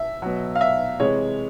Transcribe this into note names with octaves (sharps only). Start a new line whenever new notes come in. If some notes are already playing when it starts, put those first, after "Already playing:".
Already playing: E5
B2 F#3
F5
E5
C3 E3 G#3 C#5